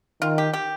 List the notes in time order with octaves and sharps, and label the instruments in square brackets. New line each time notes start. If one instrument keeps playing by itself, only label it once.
[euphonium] D#3 [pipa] F4
[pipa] G4
G4